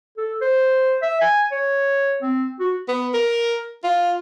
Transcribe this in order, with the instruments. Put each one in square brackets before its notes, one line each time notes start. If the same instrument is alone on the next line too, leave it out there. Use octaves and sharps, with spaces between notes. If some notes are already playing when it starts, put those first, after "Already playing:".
[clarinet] A4
C5
E5
G#5
C#5
C4
F#4
[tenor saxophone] B3
A#4
F4